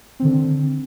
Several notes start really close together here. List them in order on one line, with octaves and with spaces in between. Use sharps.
C4 D#3 D3